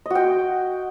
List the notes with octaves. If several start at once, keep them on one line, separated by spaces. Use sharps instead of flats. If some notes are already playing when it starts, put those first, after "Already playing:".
F#4 D#5 G5